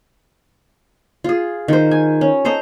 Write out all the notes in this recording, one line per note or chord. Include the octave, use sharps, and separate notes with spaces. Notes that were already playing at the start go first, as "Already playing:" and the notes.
F4 G#4
D#3 C5
G#5
C#4
A4 C5 D#5 A#5